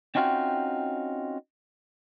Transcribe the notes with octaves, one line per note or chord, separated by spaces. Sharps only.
C4 C#4 D#4 F4 F#4 G5